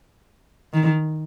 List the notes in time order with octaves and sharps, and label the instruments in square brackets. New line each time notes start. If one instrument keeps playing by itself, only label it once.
[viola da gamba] D#3